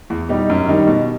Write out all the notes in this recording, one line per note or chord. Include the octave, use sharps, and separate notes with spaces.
E2
B2 G3 D#4 G4
F#2
D#3 G3 D#4
B2